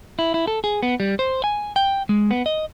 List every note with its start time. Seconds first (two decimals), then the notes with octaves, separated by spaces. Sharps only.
0.19 E4
0.34 E4
0.47 A4
0.64 G#4
0.83 B3
1.00 G3
1.19 C5
1.44 G#5
1.76 G5
2.09 G#3
2.31 B3
2.46 D#5